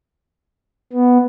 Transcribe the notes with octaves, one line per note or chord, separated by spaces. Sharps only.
B3